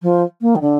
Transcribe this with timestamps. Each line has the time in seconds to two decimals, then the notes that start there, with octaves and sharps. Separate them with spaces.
0.02 F3
0.41 A#3
0.55 D#3
0.61 D3